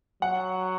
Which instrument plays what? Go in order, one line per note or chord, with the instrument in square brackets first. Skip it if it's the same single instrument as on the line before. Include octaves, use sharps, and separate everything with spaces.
[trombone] F#3 [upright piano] F#5